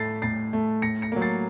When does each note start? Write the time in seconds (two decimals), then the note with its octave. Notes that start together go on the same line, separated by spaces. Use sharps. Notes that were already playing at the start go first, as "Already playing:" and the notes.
Already playing: A2 A3 A6 C7
0.22 A2 A6 C7
0.53 A3
0.82 A2 A#6 C#7
1.02 A#6 C#7
1.12 F#3 A#3
1.22 A6 C7